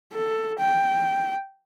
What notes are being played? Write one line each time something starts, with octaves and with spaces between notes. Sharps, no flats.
A4
G5